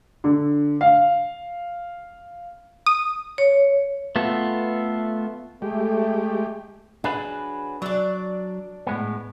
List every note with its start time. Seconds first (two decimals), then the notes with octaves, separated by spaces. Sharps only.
0.24 D3
0.81 F5
2.86 D#6
3.38 C#5
4.16 A3 B3 F4 A4
5.62 G#3 A3 G4
7.04 F#3 D4 G#4 B4
7.82 F#3 D4 D5
8.87 A2 G#3 B3